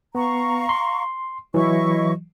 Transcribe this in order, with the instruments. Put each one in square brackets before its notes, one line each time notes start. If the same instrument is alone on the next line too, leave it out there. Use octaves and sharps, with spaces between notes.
[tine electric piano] B3 [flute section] F5 A#5 C#6
[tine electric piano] C6
[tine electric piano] E3 F#3 [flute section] E4 D#5 C#6